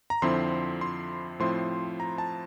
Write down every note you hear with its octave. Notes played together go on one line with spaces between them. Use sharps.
A#5
F2 D3 F3 C4 E4 C6
C6
A2 F3 C4 E4 C6
A#5
A5